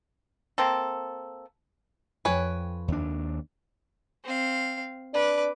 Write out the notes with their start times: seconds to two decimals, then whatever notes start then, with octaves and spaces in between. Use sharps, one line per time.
0.58 A#3 C4 A4
2.25 F2 B4 C#5 G5 G#5
2.88 D#2 D4
4.24 C4 F5
5.14 D4 B4 D6